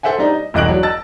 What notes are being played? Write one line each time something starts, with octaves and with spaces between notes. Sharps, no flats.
G#4 A4 C5 E5 F#5 G#5
G3 D4 D#4
D#5
E1 C2 D#5 F#6 D7 F#7
F#3 D4
D#5 A5 E6 A6